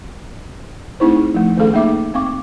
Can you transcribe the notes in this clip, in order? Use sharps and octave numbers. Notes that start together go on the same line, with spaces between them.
A3 C4 D#4 E4 G#4 C5
F3 A3
D#3 A3 C#4 G#4 A4 F5
A#3 D#4 E5 D6
C4 F5 G5 C#6 D6